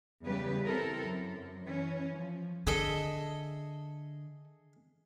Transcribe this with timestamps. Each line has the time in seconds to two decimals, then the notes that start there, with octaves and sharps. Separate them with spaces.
0.23 E2 C#3 G3 G4 B4
0.64 C4 E4 A4 A#4
1.01 F#2
1.65 E3 C#4
2.14 F3
2.67 D3 G#4 A4 D#5 E5